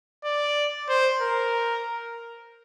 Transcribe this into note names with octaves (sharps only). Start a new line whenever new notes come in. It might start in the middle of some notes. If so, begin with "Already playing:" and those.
D5
C5
A#4